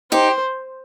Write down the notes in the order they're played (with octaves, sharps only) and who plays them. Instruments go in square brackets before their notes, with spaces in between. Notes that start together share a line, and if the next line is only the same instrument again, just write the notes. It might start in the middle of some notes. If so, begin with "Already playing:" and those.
[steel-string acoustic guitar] D#4 G4 [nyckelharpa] C5